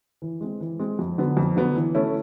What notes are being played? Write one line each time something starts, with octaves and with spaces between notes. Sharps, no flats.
E3
G#3 C4
E3
G#3 C4
F2
D3 F#3 B3
F2
D3 F#3 B3
E3
A3 C#4 E4